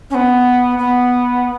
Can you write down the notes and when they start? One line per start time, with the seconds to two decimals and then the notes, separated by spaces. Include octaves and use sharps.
0.10 C#4
0.15 B3
0.79 B3